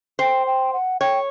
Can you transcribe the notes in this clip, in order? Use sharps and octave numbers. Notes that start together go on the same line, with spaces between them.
C5 G5
G5
F#5
C#5 G5